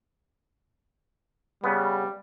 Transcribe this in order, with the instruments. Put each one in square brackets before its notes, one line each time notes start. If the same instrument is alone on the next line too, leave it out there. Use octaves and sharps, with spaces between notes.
[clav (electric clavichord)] C#3 B3 [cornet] G3